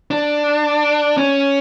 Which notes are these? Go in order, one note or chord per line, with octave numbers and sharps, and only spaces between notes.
D4
C#4